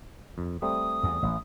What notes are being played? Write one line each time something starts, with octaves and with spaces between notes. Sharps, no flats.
F2
G3 A3 C4 D#6
E2
A1